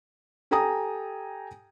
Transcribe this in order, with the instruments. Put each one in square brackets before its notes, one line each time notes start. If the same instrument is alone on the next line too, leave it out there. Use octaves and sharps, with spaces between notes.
[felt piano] G4 A4 G5 G#5 A#5 D#6